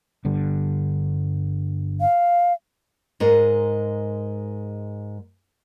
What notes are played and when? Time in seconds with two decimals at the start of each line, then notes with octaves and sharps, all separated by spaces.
0.25 G1 G2 D3
2.01 F5
3.20 G#2 G#3 A#4